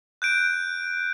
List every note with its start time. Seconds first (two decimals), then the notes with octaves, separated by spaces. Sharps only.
0.22 F#6 G6 D7